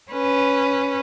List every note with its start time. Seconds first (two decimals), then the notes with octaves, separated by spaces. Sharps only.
0.12 C#4 B4